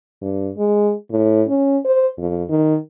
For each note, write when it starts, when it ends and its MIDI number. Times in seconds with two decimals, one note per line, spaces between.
0.22 0.51 43
0.57 0.93 56
1.11 1.43 45
1.48 1.77 61
1.85 2.08 72
2.18 2.43 41
2.49 2.77 51